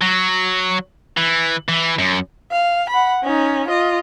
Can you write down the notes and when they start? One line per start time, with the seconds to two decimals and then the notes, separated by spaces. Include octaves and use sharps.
0.01 F#3
1.17 E3
1.68 E3
1.99 F#2
2.52 F5
2.90 F#5 B5
3.23 C#4 D#4
3.68 F4 D#5